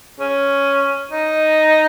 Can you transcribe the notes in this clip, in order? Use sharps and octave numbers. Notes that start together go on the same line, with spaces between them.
C#4
D#4